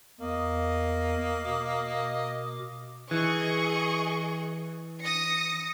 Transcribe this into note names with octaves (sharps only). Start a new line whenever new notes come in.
E2 A#3 D#5
B2 D6
E3 G#4 D#5 C#6
D#6 A#6 C#7